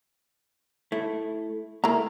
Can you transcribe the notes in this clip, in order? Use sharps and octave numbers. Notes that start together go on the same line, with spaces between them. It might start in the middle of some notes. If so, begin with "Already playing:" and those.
A3 E4
A3 A#3 E4 A#5